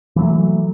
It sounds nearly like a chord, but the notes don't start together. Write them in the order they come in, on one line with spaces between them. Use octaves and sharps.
E3 F#3 A3